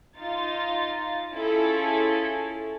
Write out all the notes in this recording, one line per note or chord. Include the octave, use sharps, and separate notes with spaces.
D#4 F4 A6
C#4 E4 F4 G#4 A4